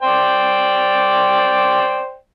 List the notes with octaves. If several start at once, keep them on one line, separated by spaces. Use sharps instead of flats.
C5 D5 G5